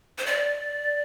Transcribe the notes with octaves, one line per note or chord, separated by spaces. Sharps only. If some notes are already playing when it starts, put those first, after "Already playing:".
C5
D5